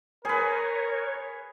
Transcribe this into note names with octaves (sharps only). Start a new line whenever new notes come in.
G#4 A#4 B4 C#5